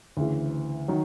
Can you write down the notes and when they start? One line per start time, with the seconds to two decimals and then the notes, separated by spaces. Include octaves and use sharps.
0.17 D2 C#3 E3
0.88 D#3 F#3